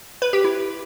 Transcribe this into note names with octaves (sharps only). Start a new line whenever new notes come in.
B4
G4
E4